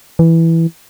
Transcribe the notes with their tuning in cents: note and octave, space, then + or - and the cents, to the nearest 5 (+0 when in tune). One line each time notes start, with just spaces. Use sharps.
E3 +0